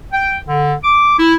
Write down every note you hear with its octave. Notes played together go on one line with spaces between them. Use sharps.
G5
D3
D6
E4